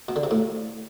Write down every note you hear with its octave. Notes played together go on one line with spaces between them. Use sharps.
B2
D3
C3
A2